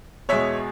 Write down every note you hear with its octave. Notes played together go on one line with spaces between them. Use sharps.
E2 B2 G#3 C#5 E5